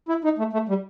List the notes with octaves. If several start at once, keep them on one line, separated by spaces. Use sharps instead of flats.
E4
D#4
A3
A3
G3